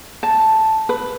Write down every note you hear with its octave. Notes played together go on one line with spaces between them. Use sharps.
A5
B4